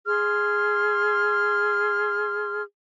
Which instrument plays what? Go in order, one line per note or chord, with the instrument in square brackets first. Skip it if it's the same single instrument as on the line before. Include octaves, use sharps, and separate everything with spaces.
[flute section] G#4 C6 F6